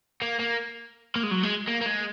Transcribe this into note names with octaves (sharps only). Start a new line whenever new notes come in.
A#3
A#3
A#3
G#3
F#3
G#3
A#3
A#3
G#3